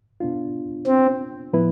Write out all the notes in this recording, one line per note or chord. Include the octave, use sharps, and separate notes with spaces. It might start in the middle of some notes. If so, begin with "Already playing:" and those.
B2 B3 D4 F4
C4
A2 F3 B3 E4 B4